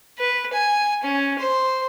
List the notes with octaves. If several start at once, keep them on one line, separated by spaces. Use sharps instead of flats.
B4
G#5
C#4
C5